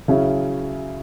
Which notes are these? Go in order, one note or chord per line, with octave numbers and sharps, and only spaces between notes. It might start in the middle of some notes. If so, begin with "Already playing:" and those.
C#3 F#3 C#4 E4